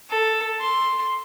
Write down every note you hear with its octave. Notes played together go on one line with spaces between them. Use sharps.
A4
C6